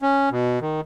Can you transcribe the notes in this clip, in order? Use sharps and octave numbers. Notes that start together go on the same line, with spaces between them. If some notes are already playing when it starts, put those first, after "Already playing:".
C#4
B2
D#3